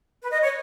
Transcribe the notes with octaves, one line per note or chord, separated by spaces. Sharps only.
B4
D#5
C#5